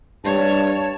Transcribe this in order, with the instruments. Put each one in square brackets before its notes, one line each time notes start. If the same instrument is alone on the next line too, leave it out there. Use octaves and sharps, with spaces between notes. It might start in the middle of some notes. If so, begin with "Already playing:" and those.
[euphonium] G2 [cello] C#5 [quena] A5